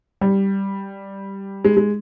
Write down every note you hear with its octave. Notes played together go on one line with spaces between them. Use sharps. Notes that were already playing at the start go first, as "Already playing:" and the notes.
G3
G#3
G#3